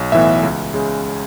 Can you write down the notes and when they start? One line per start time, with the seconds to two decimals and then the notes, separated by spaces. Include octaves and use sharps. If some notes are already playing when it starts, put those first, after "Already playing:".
Already playing: B1
0.12 A2 E3 B3 E5
0.43 C#2
0.74 C#3 G#3